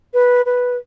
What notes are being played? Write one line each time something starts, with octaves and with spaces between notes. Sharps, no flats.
B4
B4